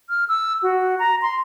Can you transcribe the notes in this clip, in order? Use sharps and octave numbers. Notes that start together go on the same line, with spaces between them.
F6
E6
F#4
A#5
C6